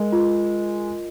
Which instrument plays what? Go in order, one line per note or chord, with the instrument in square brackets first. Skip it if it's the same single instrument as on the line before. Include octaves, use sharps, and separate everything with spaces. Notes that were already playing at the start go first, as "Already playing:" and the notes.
Already playing: [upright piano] G#3 [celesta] A#4 D#5
[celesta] F4